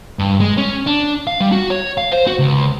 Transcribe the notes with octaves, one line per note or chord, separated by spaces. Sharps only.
G2
G#3
C#4
D4
F5
G3
F#4
C#5
F5
C5
F#4
C#2